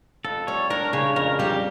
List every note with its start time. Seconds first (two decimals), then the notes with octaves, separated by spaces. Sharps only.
0.24 F2 A4
0.47 G3 C#5
0.70 D4 A#4
0.93 C#3 C#5
1.16 F2 A#4
1.39 G3 G4